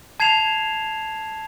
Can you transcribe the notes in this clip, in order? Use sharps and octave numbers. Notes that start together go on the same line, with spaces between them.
A5 G#6 C7 E7 F7